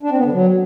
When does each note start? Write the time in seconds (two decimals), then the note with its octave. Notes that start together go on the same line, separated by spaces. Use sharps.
0.03 D4
0.10 C4
0.17 B3
0.25 D3
0.32 F#3